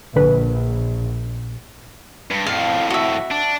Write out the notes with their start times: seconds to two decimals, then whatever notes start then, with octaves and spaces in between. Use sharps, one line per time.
0.16 A#1 D3 B4
2.30 G2
2.46 F2 A2 F5
2.90 F#4 E5
3.32 D4